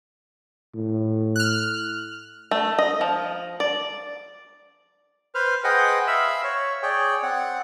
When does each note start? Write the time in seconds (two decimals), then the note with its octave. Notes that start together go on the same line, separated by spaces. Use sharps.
0.75 A2
1.36 F6 F#6
2.51 A3
2.79 D#5
3.01 F3
3.60 D5
5.35 B4 C5 F6
5.64 G#4 B4 C5 D#5 F#5 G5
6.07 E5 F5 B5 E6
6.44 C#5
6.83 G#4 C#5 D5 G5
7.23 C4 F#5